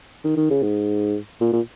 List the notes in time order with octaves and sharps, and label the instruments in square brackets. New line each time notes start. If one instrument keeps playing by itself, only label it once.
[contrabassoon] D#3
D#3
C#3
G#2
A#2
A#2